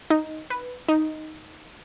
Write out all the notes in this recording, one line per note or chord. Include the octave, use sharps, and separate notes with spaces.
D#4
B4
D#4